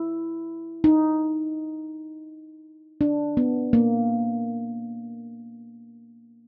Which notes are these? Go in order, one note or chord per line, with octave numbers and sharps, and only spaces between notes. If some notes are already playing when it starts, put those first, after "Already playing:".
Already playing: E4
D#4
D4
B3
A#3